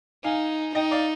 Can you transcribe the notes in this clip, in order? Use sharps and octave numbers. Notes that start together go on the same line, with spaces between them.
D#4 F5 G#5
D#4 D#5 G5
D5 F5